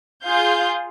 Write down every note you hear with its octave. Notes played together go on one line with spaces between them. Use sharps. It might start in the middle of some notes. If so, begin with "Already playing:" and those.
F4 G#4 F5 G6